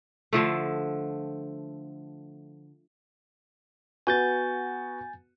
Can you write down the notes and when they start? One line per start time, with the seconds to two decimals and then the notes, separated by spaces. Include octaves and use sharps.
0.33 D3 F3 A3
4.07 B3 F#4 F#5 G#5 G6 A6